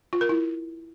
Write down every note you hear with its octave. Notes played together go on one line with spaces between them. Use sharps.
F4
A#4
E4